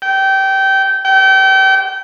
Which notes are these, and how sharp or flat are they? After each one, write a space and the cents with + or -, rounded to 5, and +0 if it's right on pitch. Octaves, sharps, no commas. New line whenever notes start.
G5 -20
G5 -30